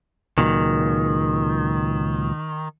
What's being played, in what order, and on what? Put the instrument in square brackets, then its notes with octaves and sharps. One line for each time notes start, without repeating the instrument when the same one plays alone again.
[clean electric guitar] C#2 A#2 F#3 [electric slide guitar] D#3